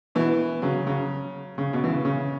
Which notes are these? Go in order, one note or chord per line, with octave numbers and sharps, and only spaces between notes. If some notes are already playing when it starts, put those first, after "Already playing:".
B2 E3
C#3 F#3
C#3 F#3
C#3
B2
E3
C#3
C#3